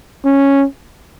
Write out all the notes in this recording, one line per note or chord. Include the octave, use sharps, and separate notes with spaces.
C#4